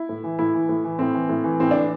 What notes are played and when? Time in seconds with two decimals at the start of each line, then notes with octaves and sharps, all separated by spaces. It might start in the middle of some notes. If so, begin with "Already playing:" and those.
Already playing: E4
0.09 A2
0.24 E3
0.39 A2 E4
0.54 E3
0.69 A2
0.84 E3
0.99 A2 C4
1.14 E3
1.29 A2
1.44 E3
1.60 A2 C4
1.71 E3 D4